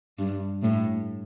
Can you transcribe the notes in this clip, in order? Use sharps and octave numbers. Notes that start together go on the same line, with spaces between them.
G2
A2